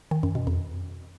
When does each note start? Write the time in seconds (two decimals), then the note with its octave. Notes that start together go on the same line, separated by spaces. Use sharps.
0.11 D#3
0.23 F#2
0.35 B2
0.47 F2